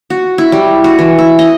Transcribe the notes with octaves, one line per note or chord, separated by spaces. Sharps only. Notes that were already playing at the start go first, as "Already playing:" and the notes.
F#4
E4
G3
F#4
E3
E4
D#5